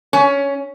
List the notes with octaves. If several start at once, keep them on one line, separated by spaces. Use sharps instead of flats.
C#4